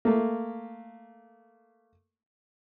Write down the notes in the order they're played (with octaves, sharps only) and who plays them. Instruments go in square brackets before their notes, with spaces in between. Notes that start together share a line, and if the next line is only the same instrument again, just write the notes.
[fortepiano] A3 A#3